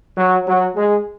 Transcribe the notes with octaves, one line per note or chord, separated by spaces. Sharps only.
F#3
F#3
G#3